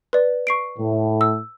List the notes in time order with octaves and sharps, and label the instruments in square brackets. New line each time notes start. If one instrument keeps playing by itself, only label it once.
[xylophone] B4 D5
C#6 C7 D7
[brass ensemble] A2
[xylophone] E6